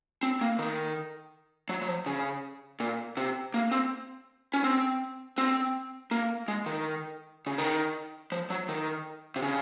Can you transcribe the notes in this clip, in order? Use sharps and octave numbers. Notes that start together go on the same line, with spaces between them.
C4
A#3
D#3
F#3
F#3
F3
C#3
A#2
C3
A#3
C4
C#4
C4
C4
A#3
G#3
D#3
C#3
D#3
F3
F#3
D#3
C3
C#3